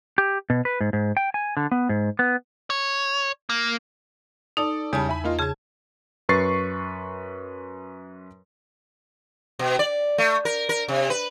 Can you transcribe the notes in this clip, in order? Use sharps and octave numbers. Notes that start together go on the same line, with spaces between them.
G4
B2
B4
G#2
G#2
G5
G#5
D3
B3
G#2
B3
C#5
A#3
D#4 A4 D5
E2 C#3 G3 A5
E5 G#5 B5
A#3 D#4 F4
C#3 G#4 A5 G#6
F#2 B4 C#6 A6 C7
B2
D5
A3
A#4
A#4
C3
B4